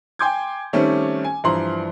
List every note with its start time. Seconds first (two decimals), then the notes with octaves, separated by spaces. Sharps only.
0.19 G5 G#5 C6 D6 G6 G#6
0.73 D#3 G3 A3 C4 C#4
1.24 G#5
1.44 G2 E3 F3 A#5 C6 F#7